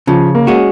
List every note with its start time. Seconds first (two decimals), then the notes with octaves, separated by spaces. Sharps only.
0.07 C#3 F3
0.35 A#3
0.47 G#3 C#4 F#4